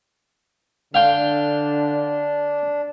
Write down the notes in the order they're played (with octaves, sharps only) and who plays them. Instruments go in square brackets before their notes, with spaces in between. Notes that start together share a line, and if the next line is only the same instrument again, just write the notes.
[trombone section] D3 [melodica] D4 [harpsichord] F5 G5 C6